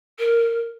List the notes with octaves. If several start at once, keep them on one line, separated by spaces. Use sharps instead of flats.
A#4